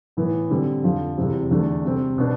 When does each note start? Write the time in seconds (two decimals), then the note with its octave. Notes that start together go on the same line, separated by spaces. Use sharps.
0.17 A2 E3 B3
0.50 D3 G3 C4
0.84 F2 D3 F3
1.18 E2 C3 E3 G3 C4
1.51 E2 D3 A3 D4
1.84 C3 G3 C4
2.18 B2 B3 D4